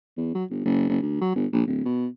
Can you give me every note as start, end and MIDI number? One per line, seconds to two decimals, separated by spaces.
0.17 0.30 40
0.35 0.44 54
0.50 0.64 31
0.65 0.85 30
0.89 0.98 30
1.02 1.19 38
1.21 1.31 54
1.36 1.46 31
1.52 1.63 34
1.67 1.83 26
1.85 2.07 47